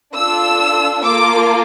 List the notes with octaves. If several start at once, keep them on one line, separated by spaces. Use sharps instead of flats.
D4 F4 A4 E6
A#3 F4 A4 D6